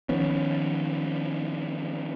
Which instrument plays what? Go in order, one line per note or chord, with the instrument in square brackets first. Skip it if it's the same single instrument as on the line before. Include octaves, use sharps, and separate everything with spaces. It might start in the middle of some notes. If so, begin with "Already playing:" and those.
[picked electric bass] D#3 F3 B3 C#4